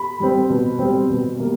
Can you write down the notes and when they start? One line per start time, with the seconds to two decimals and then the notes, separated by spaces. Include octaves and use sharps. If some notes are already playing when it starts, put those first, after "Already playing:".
Already playing: B5
0.20 G3 C4
0.50 B2
0.79 G3 C4
1.10 B2
1.39 G3 A#3